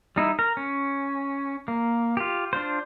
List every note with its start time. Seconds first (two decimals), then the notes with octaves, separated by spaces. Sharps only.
0.16 G3 D#4 E4
0.39 A#4
0.57 C#4
1.68 A#3
2.17 F4 G4
2.53 D4 F4 C5